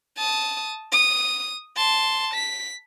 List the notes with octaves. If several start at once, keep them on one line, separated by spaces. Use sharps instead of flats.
A5 D#6
D#6
A5 C6
B6